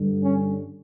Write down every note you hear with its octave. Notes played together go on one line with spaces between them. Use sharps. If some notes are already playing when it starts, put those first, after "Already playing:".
Already playing: G2 D3
C#4